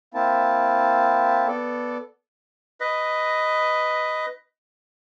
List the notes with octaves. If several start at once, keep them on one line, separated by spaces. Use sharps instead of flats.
A#3 C4 E4 A5
B3 A4 D5
B4 D#5